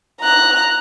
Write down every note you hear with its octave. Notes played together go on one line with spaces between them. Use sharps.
A#5 F#6